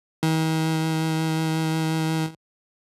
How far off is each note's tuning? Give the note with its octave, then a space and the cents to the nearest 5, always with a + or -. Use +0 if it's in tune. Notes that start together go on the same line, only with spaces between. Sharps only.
D#3 +45